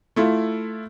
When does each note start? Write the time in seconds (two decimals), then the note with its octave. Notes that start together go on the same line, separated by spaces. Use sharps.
0.16 A3 E4 F4